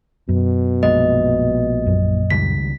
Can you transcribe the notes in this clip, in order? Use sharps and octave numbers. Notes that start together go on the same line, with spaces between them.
F#2 B2
A#1 G#3 D#5
F#2 A#2
C#2 D#3 G3 B6